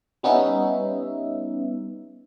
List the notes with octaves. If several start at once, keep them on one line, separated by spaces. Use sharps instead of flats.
G3 B3 C#4 D#4 E5